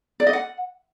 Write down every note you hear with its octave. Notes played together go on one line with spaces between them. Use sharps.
D5
D#5
F#5